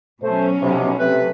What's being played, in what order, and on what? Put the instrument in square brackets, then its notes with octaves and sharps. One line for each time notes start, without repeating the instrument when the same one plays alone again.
[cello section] B2 F#3 C#4 [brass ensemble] A3 C5
[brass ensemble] B1 [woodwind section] C3
[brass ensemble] C3 [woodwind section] A3 B4